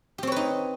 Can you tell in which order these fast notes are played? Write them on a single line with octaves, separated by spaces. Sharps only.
G4 C4 C#5 B4 D#4